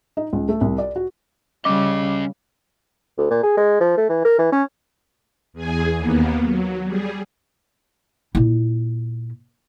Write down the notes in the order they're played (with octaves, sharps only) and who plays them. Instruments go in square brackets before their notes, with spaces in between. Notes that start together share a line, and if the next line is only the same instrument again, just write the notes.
[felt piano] D#4
C#2
A3
C2
D5
F#4
[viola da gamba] C#3 G3 [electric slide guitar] C#4 D#5 [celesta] D6
[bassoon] D2
A#2
G#4
G#3
F3
A3
E3
A#4
E3
C#4
[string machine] E2 G#4 G#5
D#2 A#3 B3
F#3
G3 G#4
[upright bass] A#2 E4